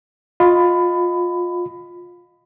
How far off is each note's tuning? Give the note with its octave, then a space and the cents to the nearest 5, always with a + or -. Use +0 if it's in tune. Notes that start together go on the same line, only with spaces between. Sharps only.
F4 +20 D#5 +0 B5 +20